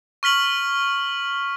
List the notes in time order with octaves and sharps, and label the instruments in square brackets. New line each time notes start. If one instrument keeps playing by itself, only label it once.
[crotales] C#6 F6 B6 F#7